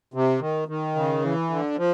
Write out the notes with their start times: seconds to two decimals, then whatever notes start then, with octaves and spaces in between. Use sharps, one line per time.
0.14 C3
0.41 D#3
0.68 D#3
0.95 C#3
1.22 E3
1.50 D3
1.77 F3